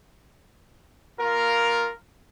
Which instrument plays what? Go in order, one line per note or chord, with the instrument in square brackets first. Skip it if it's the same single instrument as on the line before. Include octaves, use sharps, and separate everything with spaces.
[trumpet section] A#3 F4 A#4